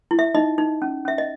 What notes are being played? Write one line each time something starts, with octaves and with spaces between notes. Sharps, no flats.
E4
E5
D#4 D#5
D#4
C#4
C#4 E5
D#5